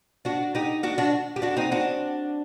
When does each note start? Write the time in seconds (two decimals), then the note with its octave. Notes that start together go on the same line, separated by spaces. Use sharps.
0.25 D4 F#4
0.55 D#4 G4
0.83 D4 F#4
0.98 D4 F#4
1.36 G4
1.42 D4 F#4
1.57 C4 D#4
1.72 D4 F#4